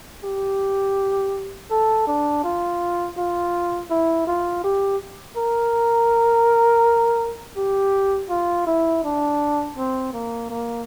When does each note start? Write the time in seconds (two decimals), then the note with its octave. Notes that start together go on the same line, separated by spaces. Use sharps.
0.24 G4
1.70 A4
2.07 D4
2.44 F4
3.17 F4
3.91 E4
4.27 F4
4.64 G4
5.37 A#4
7.57 G4
8.30 F4
8.66 E4
9.04 D4
9.76 C4
10.13 A#3
10.50 A#3